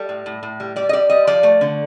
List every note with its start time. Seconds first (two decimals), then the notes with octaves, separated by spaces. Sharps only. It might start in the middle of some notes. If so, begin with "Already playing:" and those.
Already playing: G3 A4
0.09 A2
0.26 A2
0.43 A2
0.60 G3
0.76 G3 D5
0.89 D#5
0.93 G3 D5
1.10 G3 D#5
1.27 F3 D5
1.43 A3
1.61 D3